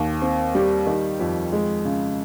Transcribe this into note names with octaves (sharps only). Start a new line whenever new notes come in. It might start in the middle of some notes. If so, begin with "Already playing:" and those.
Already playing: D#2
C4
G3
D#3
F2
G#3
C#3